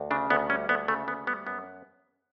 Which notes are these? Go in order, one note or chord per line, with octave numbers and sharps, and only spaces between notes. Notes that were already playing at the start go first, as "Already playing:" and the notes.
Already playing: D2
C#3 D4
D2 B3
G3 C#4
D2 B3
C#3 A3
D2 B3
G3 B3
F#2 B3